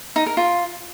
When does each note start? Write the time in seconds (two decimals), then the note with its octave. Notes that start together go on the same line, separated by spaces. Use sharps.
0.16 D#4
0.26 A#4
0.37 F4